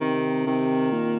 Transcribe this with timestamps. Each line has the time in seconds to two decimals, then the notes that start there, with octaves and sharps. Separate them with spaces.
0.01 C3 D#3
0.46 C3 D#3
0.92 A#2